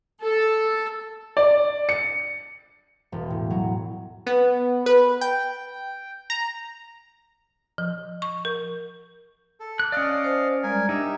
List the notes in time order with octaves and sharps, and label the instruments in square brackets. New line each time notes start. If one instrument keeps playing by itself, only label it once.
[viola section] A4
[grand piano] D5
C#7
[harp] E1
A2
F#3
[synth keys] B3
B4
G5
A#5
[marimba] F3
C#6
A#4
[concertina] A4
[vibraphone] A5 D6 [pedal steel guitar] F#6
[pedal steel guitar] C#4 D5 [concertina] D#5 F5
[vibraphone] C5
[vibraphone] G3 G#3 D5 [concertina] A#4 G#5
[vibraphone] D4 [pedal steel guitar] D#4 [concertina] G4 E5